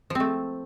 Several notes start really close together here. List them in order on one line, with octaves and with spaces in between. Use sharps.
F3 C4 A3